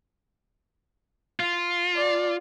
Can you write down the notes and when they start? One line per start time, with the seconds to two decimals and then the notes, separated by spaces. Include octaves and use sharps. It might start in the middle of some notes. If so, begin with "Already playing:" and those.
1.40 F4
1.96 D5